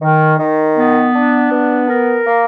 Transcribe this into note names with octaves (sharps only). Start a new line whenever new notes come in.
D#3
D#3
B3
D4
B3
A#4
A#3